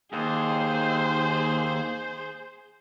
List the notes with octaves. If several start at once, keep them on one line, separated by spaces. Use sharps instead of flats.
D#2 G#4 C5